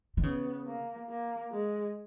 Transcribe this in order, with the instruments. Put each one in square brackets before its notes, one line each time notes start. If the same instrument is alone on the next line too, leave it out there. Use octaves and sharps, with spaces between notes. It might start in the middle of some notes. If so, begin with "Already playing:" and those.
[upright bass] D#3
[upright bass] C#3 [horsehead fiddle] B3
[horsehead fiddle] A#3
A#3
G#3